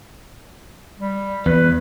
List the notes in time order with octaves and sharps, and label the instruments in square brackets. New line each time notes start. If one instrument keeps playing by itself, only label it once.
[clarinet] G3
[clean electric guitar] E2 [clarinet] B4